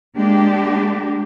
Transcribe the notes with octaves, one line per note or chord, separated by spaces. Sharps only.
G#3 A#3 D4 G4